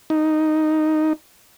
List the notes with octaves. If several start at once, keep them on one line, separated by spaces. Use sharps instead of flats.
D#4